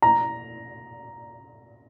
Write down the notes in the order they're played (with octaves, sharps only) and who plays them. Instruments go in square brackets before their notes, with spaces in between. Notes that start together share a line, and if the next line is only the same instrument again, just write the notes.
[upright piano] A#5